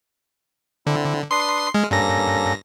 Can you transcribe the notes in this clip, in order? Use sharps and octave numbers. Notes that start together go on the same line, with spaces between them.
D3 C4 E4
D4 B4 C6 D#6 C7
G#3 F6
G2 A#3 C#4 A4 A#6